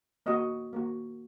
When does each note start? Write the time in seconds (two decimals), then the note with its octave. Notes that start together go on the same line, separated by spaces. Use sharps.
0.26 A#3 F#4 D#5
0.73 A#3 F#4